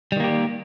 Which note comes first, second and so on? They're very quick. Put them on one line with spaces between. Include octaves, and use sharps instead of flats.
G3 D#3 A#3 G4